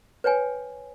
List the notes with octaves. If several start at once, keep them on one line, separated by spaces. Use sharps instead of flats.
B4 C#5 G5 G#5